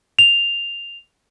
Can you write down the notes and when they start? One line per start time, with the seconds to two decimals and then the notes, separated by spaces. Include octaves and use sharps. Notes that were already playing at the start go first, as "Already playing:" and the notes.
0.19 F7